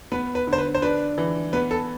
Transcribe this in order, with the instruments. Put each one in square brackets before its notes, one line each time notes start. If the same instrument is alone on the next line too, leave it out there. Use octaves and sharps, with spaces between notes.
[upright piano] B3 [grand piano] B4
[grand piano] B4
[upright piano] D3
[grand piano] C5
B4
C5
[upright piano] D4 [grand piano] B4
[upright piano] E3
[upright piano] B3 [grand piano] B4
[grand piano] A4